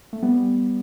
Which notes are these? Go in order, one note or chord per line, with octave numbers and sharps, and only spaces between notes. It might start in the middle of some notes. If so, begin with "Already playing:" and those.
A3
G3 B3